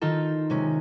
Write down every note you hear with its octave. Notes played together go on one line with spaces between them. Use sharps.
D#3 D#4 F4 A4
C3 G#3 C#4